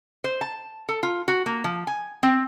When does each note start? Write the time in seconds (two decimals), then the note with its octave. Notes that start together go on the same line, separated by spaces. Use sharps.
0.24 C5
0.41 A5
0.89 A4
1.03 F4
1.28 F#4
1.46 A#3
1.64 F3
1.87 G#5
2.23 C4